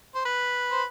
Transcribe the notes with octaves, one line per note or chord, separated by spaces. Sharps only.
C5
B4
C5